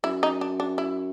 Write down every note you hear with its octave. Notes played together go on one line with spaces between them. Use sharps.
F#2 E4
D#4
D4
D4
E4